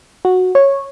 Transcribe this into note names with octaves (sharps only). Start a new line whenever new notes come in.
F#4
C#5